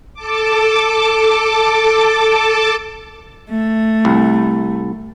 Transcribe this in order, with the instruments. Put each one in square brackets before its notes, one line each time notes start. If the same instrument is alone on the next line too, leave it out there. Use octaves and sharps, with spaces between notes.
[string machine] A4 A5 D6
[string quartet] A3
[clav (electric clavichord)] C2